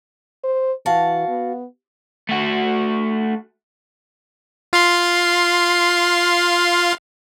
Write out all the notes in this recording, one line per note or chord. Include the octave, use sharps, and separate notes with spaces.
C5
E3 F#4 F5 A5
B3
A3 F#4
F4 F5 C6